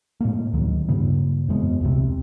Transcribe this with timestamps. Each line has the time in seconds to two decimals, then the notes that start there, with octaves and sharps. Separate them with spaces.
0.21 A2 G#3 A#3
0.53 D2 D#3 F#3
0.89 G2 C#3 A#3
1.48 F2 E3 G#3 B3
1.81 D#1 C2 C3